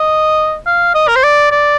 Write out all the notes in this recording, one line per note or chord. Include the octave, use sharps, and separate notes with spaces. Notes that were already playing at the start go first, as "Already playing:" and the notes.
Already playing: D#5
F5
D#5
A#4
C5
D5
D5